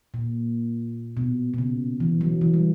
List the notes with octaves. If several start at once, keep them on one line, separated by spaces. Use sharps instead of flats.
A#2
B2
B2
C#3
E3
F#3
E3
G3